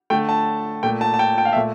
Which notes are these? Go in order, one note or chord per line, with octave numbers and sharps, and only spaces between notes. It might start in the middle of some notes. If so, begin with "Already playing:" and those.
D3 A3 G5
A5
A#2 A3 G5
A5
A5
G5
G5
F5
E5
A#2 A3